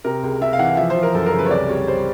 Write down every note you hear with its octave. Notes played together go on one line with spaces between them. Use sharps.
C3 A#4
C#2
C3 E5
F5
E3 F#5
F3 E5
C5
F3
A#4
F#2 A4
A#4
C#3
B4
C#5
C2 D5
G3 C#5
G3 C5